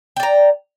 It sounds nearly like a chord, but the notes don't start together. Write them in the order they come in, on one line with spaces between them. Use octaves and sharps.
G5 D5 A#5